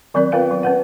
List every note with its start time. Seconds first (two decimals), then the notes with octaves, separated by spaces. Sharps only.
0.14 D#3 F#3 B3 C4 A#4 D5
0.32 B3 F4 A#4 B4 F5 G5
0.51 F#3
0.63 C#4 B4 F#5